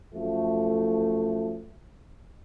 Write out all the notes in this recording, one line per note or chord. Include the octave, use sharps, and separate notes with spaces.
F#2 F3 A3